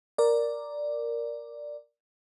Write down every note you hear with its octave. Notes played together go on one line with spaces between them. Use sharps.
A#4 D5